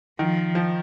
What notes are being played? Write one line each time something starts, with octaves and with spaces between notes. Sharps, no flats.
D#3 F3
F3